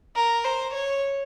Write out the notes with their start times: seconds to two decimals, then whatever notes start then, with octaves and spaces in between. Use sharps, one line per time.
0.16 A#4
0.44 C5
0.74 C#5